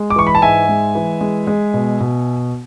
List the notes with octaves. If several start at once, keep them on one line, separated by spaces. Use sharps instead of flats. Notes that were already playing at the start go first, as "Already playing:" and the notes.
Already playing: G#3
D6
E3 C#6
B5
A5
G#2 E5 G#5
G#3
E3
G#3
G#3
B2
B2